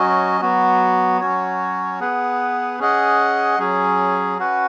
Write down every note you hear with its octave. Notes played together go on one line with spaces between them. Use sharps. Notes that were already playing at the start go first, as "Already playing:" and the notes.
Already playing: F#3 C#4 F#4 D#5
F#3 B3 F#4
F#3 C#4 F#4 C#5
B3 G#4 B4 F#5
C#4 G#4 D#5 F#5
F#3 C#4 G#4
C#4 F#4 B4 F#5